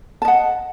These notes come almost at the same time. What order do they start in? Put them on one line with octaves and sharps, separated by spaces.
A5 D#5 F#5